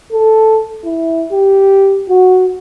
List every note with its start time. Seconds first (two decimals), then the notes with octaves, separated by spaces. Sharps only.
0.12 A4
0.84 E4
1.32 G4
2.09 F#4